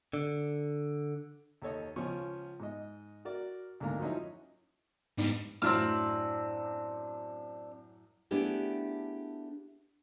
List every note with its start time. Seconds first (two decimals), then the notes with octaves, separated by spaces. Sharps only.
0.13 D3
1.62 D#2 A4 C#5 D#5
1.96 C#2 F3 C#4 C#6
2.60 G#2 D#5
3.25 F#4 A#4 D5
3.80 D2 G#2 A#3 F5 A#5
4.00 F3 F#3 C#4 D#4 E4
5.18 G#2 G3 B3 D4 D#4
5.62 F#2 A2 F#3 C4 D4 F6
8.31 A3 B3 D4 E4 G4 G#4